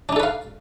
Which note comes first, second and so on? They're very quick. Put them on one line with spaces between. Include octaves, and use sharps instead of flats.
D4 D#4 A4 B4 F5